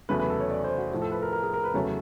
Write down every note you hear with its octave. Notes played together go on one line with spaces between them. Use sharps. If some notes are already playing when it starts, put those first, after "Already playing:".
E2 C#3 F#3 A3 B4
B4
A4
C#5
D5
C5
F#4
A2 F3 A3
A4
B4
A#4
A#4
G#4
A#4
B4
E2 C#3 F#3 A3 C#5